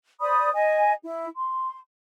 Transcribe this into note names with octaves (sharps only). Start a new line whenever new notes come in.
C5 D5 B5 D#6
D#5 G#5
E4
C6